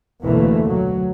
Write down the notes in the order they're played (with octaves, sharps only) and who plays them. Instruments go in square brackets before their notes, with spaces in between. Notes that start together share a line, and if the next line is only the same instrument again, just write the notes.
[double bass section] F1 D2 B2 E3 A3 A#3
F#3